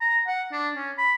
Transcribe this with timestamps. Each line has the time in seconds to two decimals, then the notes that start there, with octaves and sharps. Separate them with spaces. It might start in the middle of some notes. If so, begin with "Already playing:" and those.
0.01 A#5
0.27 F#5
0.52 D4
0.74 C#4
0.98 B5